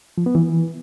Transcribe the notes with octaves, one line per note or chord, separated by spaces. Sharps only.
F3
B3
E3